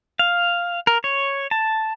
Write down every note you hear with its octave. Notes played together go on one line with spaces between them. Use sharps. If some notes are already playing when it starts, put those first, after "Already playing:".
F5
A#4
C#5
A5